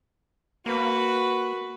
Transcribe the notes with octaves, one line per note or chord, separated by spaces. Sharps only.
A#3 F#4 B4